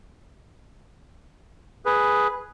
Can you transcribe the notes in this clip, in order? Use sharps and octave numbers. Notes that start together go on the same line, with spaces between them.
G#4 B4